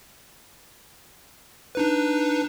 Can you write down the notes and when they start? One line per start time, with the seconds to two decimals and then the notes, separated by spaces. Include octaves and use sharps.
1.75 D4 D#4 B4